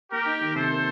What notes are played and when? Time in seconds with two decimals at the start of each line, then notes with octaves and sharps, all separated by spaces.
0.11 A#3 G4 A#4
0.26 D#4
0.41 D#3
0.55 C3 A4 C5
0.70 A#3